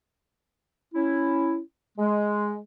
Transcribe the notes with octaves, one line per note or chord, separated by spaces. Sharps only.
C#4 E4
G#3